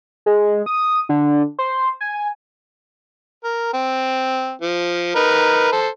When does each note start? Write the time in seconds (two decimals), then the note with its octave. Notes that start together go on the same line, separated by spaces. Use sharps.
0.26 G#3
0.66 D#6
1.09 D3
1.59 C5
2.01 G#5
3.44 A#4
3.73 C4
4.61 F3
5.16 D#4 A#4 B4
5.73 A4 C5